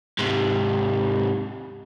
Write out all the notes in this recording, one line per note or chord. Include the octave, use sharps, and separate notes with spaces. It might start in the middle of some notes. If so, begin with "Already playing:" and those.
G#2 C3